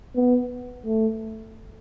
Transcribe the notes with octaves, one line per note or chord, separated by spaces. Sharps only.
B3
A3